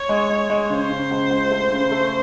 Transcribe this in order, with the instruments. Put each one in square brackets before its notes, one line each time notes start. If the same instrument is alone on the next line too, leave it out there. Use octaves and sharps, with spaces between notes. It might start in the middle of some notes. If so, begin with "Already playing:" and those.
Already playing: [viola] C#5
[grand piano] G#3
G#3
G#3
[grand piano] C#3 [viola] C5
[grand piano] C#3
C#2
C#2
A3
C#3
A3